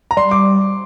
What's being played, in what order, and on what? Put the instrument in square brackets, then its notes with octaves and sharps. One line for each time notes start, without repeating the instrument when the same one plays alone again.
[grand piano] A#5
[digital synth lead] G3 [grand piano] C6
[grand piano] D6